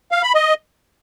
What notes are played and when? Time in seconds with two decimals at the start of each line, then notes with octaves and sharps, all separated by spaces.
0.11 F5
0.23 B5
0.35 D#5